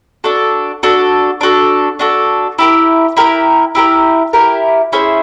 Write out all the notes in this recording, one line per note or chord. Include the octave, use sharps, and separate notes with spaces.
D4 F#4 A4
D4 F#4 A4
D4 F#4 A4
D4 F#4 A4
E4 G4 A#4
E4 G4 A#4
E4 G4 A#4
E4 G4 A#4
C#4 E4 G#4 C5